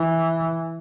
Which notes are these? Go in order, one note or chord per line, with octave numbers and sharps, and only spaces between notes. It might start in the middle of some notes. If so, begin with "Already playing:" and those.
Already playing: E3